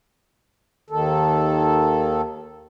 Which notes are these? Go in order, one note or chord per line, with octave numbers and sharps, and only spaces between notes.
D#2 D#3 A4